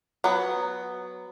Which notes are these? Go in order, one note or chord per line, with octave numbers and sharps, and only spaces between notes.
F#3 B3